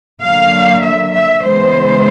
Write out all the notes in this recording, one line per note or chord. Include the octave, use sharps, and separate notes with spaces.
D3 F#3 A#3 F5
E5
E5
C#3 E3 G#3 B3 C5